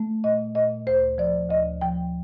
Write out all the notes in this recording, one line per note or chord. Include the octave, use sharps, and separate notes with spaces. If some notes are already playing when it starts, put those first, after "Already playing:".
Already playing: A3
A#2 D#5
A#2 D#5
D2 C5
F3 D5
D2 D#5
F3 G5